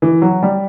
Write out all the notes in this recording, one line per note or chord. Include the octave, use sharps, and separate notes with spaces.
E3
F#3
G3